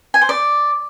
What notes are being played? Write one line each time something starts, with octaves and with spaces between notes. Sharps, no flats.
G#5
C5
D5